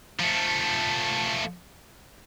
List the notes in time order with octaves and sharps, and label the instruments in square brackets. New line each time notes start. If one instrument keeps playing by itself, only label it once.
[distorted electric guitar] F3 A3